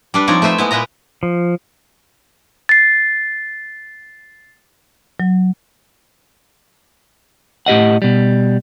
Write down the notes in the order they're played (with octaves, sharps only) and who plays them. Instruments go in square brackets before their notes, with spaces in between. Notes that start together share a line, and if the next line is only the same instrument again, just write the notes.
[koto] G3 D4 B4
F3 C4 D#4 C#5 D5
A3 B4 C5 E5
G#3 B3 E4
A#2 G#3 B4 D#5 A#5
[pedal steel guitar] F3
[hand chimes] A6 C7
[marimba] F#3
[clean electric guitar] A2 G4 D#5 F#5
B2 G3